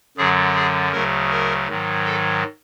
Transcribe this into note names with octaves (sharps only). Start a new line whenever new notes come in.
F#2 D3 F#3 G#4
G#4
D2 C#3 F#3 A#4
A#4
G#2 D#3 F#3
A4